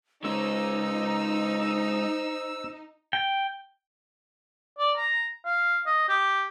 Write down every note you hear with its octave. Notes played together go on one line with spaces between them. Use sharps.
G#3 C#4 D#4 C5 E6
G5
D5
A#5
F5
D#5
G4